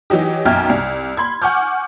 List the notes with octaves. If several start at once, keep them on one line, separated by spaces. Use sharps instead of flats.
E3 F#3 D#4 G4
B1 F#2 E5 G5 F6 G#6
C2
B5 C6 G#6
F#5 G#5 C#6 D6 F6 G6